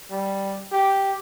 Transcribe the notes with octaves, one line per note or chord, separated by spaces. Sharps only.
G3
G4